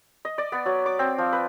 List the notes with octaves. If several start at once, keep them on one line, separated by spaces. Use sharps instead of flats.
D#5
D5
B3
F#3
D6
C4
F3
B4